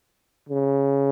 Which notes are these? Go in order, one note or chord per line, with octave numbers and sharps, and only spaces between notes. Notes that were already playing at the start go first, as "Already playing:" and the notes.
C#3